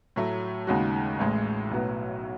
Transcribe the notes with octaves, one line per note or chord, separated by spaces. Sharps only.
A2 F#3 A3
D#2 C#3 G#3 D#4 F#4
A1 A2 G#3
B1 A2 F#3 B3 F#4